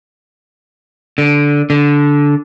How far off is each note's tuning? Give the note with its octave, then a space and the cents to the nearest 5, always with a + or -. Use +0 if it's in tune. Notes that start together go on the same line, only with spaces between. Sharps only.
D3 -10
D3 -15